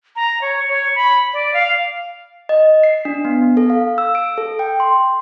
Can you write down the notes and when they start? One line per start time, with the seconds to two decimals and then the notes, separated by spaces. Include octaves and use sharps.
0.16 A#5
0.42 C#5
0.69 C#5
0.95 B5
1.33 D5
1.54 F5
2.49 D#5
2.83 C7
3.05 D4
3.25 B3
3.57 A4
3.70 F5
3.98 E6
4.15 D7
4.38 A4
4.59 G5
4.80 C6